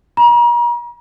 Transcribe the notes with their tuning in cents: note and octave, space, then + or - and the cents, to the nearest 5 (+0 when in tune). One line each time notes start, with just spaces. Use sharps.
A#5 +40